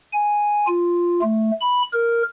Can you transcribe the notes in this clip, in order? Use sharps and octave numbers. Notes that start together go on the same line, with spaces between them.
G#5
F4
A3
B5
A#4